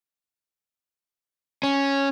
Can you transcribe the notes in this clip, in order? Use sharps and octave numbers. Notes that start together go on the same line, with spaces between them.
C#4